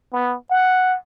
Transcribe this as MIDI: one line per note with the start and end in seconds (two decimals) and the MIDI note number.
0.13 0.37 59
0.51 0.97 78